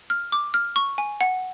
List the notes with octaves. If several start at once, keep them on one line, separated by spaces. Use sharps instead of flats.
F6
D6
F6
C#6
G#5
F#5